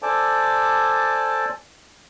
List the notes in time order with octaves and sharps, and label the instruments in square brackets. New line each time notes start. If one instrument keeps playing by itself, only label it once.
[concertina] A4 C5 D5 G#5 A5 D6